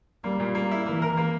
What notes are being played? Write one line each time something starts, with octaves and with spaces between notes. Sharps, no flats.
G3 A#3
A#2
A#3
E4
E3 A#3
A#4
A#3